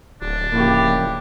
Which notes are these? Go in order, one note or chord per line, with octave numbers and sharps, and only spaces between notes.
D1 D4
C#3 F3 A#3 E4 G4